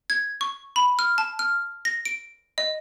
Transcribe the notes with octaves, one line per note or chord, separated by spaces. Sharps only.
G#6
C#6
B5
F6
A5
F6
A#6
D7
D#5